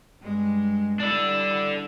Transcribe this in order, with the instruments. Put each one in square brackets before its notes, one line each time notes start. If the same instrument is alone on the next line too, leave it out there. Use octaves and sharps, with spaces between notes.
[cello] G2 G#3
[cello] G3 E4 [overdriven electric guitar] D4 A4